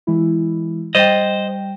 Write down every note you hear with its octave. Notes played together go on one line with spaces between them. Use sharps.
E3 G#3 E4
G3 C5 D#5 G5